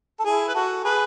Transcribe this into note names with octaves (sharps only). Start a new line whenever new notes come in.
A4
E4 G#4
B4
F#4 A4
G#4 B4